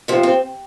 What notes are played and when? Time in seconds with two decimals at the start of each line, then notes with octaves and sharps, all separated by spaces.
0.08 C3 F3
0.23 C4